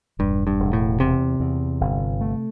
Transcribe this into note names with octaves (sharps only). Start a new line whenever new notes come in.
E1 G2
G2
E1
A2
E2 C3
E2
G1
A3